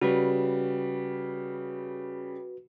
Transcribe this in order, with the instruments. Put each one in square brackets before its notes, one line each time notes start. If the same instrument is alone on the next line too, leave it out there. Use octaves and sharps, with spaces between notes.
[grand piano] C#3 G3 [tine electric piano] F#4 B4